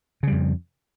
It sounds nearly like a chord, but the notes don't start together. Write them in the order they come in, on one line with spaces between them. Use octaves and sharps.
C#3 G3 F2